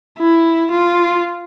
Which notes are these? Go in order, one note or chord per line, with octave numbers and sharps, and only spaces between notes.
E4
F4